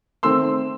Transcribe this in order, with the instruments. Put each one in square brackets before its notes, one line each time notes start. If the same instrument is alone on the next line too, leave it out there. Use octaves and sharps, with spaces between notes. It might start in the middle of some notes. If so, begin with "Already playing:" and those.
[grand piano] D#3 A3 C4 C6 E6